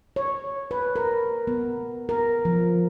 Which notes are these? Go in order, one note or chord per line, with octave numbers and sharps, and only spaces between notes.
C#5
B4
A#4
B3
A#4
F3